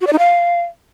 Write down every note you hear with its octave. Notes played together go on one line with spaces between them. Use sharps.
F#4
D5
D#4
F5